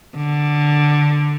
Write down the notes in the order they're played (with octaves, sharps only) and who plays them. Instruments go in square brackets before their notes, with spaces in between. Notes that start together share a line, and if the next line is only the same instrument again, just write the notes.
[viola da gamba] D3